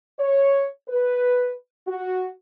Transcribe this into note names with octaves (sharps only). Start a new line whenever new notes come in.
C#5
B4
F#4